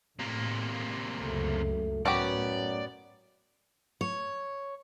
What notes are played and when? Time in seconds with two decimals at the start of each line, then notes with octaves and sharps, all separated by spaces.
0.19 A2 C3 A#3
1.20 C#2 F#2 A3
2.05 F#2 A2 B3 F#4 G4 D5
4.01 C#5